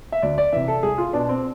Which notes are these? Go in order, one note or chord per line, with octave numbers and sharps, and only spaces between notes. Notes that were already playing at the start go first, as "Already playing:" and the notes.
E5
D2 D5
D5
C3 E3 E5
A4
C2 G#4
F4
B2 D4
C4